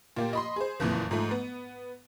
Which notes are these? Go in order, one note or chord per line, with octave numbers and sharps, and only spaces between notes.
A#2 A#3 G4
D#5 B5 C6
G#4 C5
F#1 F2 A#2 E3
G#2 F3 A3
B3